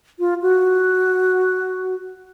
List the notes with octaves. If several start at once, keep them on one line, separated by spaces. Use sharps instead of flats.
F4
F#4